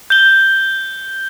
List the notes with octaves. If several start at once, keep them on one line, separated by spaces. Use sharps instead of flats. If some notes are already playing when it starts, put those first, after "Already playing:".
G6 G7